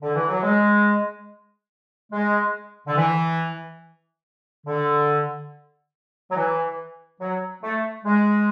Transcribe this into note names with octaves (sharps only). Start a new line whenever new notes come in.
D3
E3
F#3
G#3
G#3
D3
E3
D3
F#3
E3
F#3
A3
G#3